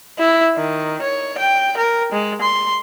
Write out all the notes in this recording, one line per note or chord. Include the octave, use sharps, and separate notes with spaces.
E4
D#3
C#5
G5
A#4
G#3
C6